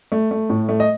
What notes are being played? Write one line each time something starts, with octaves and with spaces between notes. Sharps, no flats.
A3
A3
A2
A3
D#5